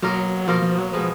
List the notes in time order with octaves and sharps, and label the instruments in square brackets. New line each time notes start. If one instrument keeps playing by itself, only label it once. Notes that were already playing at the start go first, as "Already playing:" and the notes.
[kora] B2 A#3 F4 A#4 [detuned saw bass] F#3
[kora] B2 A#3 F4 A#4 [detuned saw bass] F3
[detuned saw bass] F3
F#3
[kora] B2 G#3 B3 [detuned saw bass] F3